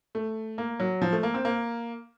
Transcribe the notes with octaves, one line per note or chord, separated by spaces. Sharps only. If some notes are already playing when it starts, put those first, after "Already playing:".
A3
A#3
F#3
F3
A3
A#3
C4
A#3